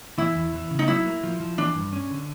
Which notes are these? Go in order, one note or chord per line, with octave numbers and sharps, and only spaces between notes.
E3 E4
E2
E3
C#3
D#4
F#3 E4
A#3
F3
F3
E3 D4
G2
C#4
D3